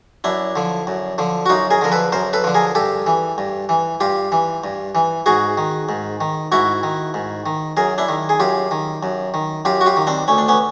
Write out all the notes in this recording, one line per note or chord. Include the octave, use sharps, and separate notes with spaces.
F#2 D4 E4
D3 F3
F#2
D3 F3
F#4
F#2 D#4 F4
G#4 A#4
D3 F3 A#4
A4 B4
F#2 A#4 C5
A4 B4
D3 F3
G#4 A#4
G2 G4 A4
E3
G2
E3
G2 F4 G4
E3
G2
E3
G#2 F#4 G#4
D#3
G#2
D#3
G#2 E4 F#4
D#3
G#2
D#3
F#2 G#4 A#4
D4 E4
D#3
G#4
F#2 F4 G4
D#3
F#2
D#3
F#2 F4 G4
F#4
F4 G4
D#3
C4 D4
D2 C#4
D4
B3 C#4